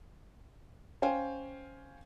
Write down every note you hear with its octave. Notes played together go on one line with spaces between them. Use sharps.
C#4 C5 F5 G5 G#5